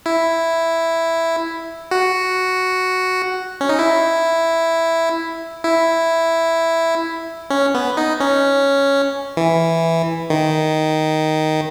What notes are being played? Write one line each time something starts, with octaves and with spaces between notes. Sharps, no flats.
E4
F#4
C#4
D#4
E4
E4
C#4
B3
D#4
C#4
E3
D#3